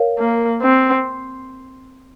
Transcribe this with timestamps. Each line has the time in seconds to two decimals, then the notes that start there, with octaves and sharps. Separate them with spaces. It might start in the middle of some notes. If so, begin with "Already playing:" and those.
Already playing: A#4 C#5 F5
0.19 A#3
0.62 C4